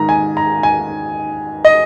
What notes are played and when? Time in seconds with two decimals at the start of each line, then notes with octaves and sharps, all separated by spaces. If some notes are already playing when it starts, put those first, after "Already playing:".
Already playing: G#2 D#3 A#5
0.09 G#5
0.37 A#5
0.63 G#5
1.65 D#5